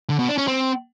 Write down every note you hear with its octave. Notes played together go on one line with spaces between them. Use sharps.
D3
B2
D4
C#4
C4